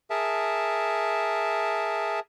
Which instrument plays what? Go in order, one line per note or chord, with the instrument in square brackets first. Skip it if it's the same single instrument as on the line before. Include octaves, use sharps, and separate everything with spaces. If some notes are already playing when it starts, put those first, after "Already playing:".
[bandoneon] G#4 A#4 E5 A5